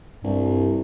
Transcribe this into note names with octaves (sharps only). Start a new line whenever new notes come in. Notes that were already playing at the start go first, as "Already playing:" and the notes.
C2 G2